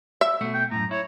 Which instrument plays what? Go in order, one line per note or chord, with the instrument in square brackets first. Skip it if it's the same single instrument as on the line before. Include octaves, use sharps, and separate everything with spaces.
[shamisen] E5
[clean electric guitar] B2 A3 F#4
[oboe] G5
[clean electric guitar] F#2 A2 [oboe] A#5
[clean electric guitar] E4 [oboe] C#5